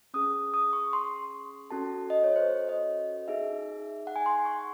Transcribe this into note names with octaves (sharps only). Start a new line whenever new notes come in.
C#4 G#4 D#6
D#6
C#6
C6
C#4 F#4 A4 A5
D#5
C#5
C5
D#5
D#4 G#4 E5
F#5
G#5
C6
C#6